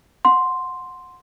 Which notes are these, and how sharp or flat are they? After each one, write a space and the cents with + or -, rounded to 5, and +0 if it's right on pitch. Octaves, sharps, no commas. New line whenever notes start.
F#5 -20 C6 +0